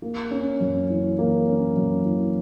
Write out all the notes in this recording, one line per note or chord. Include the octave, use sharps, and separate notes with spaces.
A#3
C#4
F#2
E3
A#3
C#4
F#2
E3